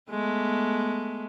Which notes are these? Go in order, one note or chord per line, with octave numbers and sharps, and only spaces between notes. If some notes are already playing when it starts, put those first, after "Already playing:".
G#3 A3 B3